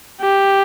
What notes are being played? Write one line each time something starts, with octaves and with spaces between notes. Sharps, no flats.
G4